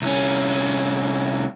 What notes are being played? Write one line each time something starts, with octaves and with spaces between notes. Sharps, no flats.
C2 C#4